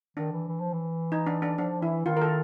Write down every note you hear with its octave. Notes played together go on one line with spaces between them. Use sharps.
D#3 D4
E3
E3
F3
E3
D#4
D4
D4
F3 D4
E3 E4
D#3 F4
A#4
A4